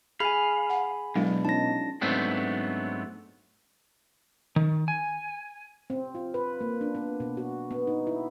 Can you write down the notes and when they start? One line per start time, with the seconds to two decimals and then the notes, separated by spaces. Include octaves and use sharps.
0.20 G#4 F5 G#5 B5
0.70 F#5
1.16 B2 F#3 G#3 D4 E4
1.45 C#4 D#4 F4 A5 A#6
2.01 G#2 F#3 A3 B3 C4 D4
4.56 D#3
4.88 G#5
5.90 C4
6.15 F4
6.34 B4
6.61 A#3
6.81 D4
6.95 B3
7.20 B2
7.37 F#4
7.71 B3
7.87 D#4
8.07 E4